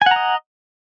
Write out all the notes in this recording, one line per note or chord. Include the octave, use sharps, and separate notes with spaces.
D#5 F#5 G#5 A#5